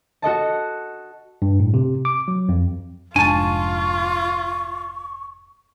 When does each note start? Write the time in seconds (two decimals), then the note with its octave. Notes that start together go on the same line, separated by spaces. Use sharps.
0.22 F#4 A4 D#5 A5
1.42 G2
1.60 A2
1.74 C3
2.05 D6
2.28 F#3
2.49 F2
3.16 F1 G#2 D4 F4 G#5 A5 C#6